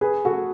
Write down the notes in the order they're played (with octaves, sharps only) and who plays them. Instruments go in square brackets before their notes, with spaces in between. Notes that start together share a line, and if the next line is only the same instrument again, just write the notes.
[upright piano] G#4 B4
F#4 A4